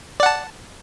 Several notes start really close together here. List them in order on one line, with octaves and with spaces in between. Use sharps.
D5 F#5 A5